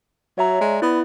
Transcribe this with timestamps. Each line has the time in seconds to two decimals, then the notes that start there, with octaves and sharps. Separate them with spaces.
0.38 F#3 C#5 E5 A#5
0.61 G#3 D5
0.82 B3 E4